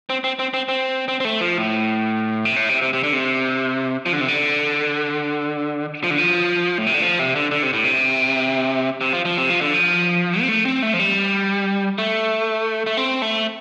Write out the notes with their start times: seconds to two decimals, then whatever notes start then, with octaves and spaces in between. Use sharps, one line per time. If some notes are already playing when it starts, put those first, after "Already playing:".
0.10 C4
0.24 C4
0.39 C4
0.54 C4
0.69 C4
1.08 C4
1.20 C4
1.25 A3
1.41 F3
1.58 A2
2.45 C3
2.56 A2
2.69 C3
2.81 C3
2.93 C3
3.04 D3
3.13 C3
4.06 F3
4.13 D3
4.21 C3
4.28 D3
6.04 F3
6.10 D3
6.18 F3
6.78 A2
6.87 C3
6.94 D3
7.02 F3
7.19 C3
7.35 D3
7.51 D3
7.63 C3
7.73 A2
7.84 C3
9.01 C3
9.13 F3
9.25 F3
9.38 C3
9.50 F3
9.61 D3
9.74 F3
10.41 C4
10.48 A3
10.65 C4
10.82 A3
10.93 F3
10.99 G3
11.98 A3
12.86 A3
12.97 C4
13.22 A3